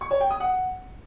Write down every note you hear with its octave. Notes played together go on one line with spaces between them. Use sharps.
C#6
C#5
G5
D#6
F#5